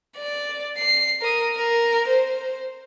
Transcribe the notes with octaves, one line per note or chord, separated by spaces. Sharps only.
D5
C7
A#4 D#6
A#4
C5